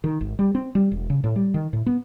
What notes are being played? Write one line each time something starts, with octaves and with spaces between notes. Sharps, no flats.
D#3
G#1
G3
C4
G3
E1
C#3
A2
G3
D#3
A2
B3